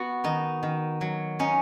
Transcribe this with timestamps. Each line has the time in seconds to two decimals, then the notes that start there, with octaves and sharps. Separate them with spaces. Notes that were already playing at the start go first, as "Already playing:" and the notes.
Already playing: B3 F#4
0.24 D#3 D#4
0.63 D#3
1.01 F#3
1.39 C#4 D#4